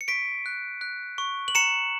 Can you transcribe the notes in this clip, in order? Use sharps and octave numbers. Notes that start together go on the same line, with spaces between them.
C#7
C#6 B6 D7
F#6
F#6
C#6
F#7
A#5 C#7 E7